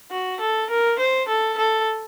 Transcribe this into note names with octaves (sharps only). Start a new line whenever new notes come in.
F#4
A4
A#4
C5
A4
A4